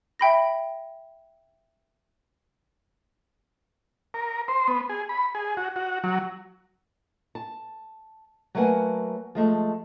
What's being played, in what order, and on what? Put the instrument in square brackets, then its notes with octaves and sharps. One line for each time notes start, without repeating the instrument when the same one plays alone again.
[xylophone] E5 G5 B5 A#6
[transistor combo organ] A#4
C5
B3
G#4
B5
G#4
F#4
F#4
F#3
[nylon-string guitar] A5
F#3 A3 A#3 B4 F#5 G#5
F3 G#3 A3